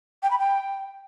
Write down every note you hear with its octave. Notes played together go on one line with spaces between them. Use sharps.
G5
B5
G5